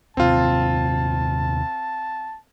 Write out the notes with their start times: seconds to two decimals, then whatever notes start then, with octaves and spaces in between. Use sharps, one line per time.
0.17 D#1 D#2 C3 C4 F4 A5